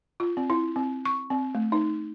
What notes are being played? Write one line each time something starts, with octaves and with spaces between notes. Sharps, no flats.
F4
C4
E4
C4
C#6
C4
A3
D#4